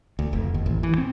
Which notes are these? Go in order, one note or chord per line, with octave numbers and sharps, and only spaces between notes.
D2
F1
D#2
A1
E3
C4